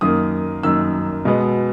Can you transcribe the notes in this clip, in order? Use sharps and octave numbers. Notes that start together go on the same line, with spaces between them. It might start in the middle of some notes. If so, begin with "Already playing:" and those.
F#2 D#3 A#3 D#6
F#2 D#3 A#3 E6
B2 G#3 B3